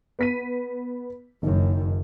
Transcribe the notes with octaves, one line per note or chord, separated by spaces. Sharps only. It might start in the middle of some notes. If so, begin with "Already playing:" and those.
B3 B6 D#7
F#1 F#2 D#3